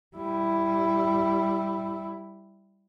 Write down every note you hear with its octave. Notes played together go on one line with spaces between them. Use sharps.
G3 E4